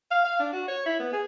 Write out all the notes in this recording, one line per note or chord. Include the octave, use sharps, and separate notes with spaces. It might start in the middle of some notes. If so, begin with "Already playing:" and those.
F5
F5
D4
F#4
C#5
E4
B3
G#4